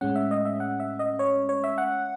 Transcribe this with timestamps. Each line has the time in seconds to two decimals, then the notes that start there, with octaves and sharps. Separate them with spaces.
0.01 A2 G#3 C#4 F#5
0.16 E5
0.31 D#5
0.45 E5
0.60 F#5
0.80 E5
0.99 D#5
1.19 C#5
1.49 C#5
1.64 E5
1.78 F#5